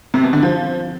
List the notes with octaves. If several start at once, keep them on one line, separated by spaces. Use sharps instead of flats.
C3
B2
D3
F3